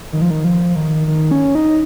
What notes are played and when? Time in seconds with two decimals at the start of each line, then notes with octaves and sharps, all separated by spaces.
0.13 D#3
0.21 F3
0.30 D#3
0.45 F3
0.76 D#3
1.07 D#3
1.31 C#4
1.55 D#4